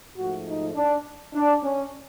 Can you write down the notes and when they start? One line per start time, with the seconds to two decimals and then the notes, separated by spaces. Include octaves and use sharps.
0.16 G#2 F3 A3 F#4
0.46 D#4
0.75 D4
1.33 D4
1.63 C#4